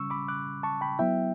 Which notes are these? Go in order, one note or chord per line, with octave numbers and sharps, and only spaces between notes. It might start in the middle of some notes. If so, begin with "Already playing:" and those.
Already playing: C#3 G3 C#4 C#6 E6
B5 D6
D6 F#6
A5 C#6
G5 B5
F#3 B3 E4 E5 G5